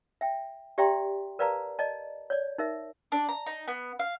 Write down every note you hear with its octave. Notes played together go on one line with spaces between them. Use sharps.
E5 G5
G4 D5 E5 G5 A#5 C6
A#4 B4 D5 F5 A5 A#5
D5 D#5 A5
C#5 D5
D#4 A#4 E5
D4
A#5
D#4
B3
F5